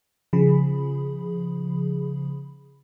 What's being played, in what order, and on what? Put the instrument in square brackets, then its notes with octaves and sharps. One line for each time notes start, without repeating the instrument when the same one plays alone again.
[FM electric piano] C#3 F3 G#4 B5